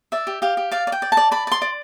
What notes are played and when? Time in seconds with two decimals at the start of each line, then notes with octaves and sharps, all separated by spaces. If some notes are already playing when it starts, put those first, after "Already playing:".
0.12 D5 E5
0.27 G4
0.42 G4 F5
0.57 G4
0.71 D5 F5
0.87 D5
0.92 G5
1.02 D5
1.12 A5
1.17 D5
1.31 D5 B5
1.47 D5 C6
1.62 D5